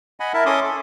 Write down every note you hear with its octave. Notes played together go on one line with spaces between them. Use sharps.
D#5 F#5 G#5 B5
E4 A#4 E5 A5
C#4 A4 C6 D6 D#6
A4